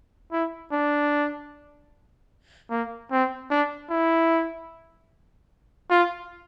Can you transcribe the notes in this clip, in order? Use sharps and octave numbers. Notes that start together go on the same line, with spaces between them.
E4
D4
A#3
C4
D4
E4
F4